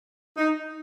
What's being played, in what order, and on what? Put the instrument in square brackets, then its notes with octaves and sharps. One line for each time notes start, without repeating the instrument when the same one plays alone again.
[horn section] D#4